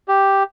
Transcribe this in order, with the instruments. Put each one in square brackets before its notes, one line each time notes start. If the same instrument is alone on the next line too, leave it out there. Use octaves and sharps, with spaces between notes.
[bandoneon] G4